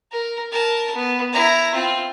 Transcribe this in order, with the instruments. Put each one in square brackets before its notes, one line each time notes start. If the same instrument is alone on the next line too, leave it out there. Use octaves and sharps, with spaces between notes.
[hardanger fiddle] A#4
A#4 A5
B3
E4 A#5
C4 F4